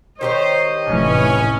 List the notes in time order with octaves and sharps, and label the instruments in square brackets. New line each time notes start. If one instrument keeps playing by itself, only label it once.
[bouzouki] D#3 G4 C#5 [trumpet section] C5 [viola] D#5
[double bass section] F1 A2 E3 [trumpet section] C#4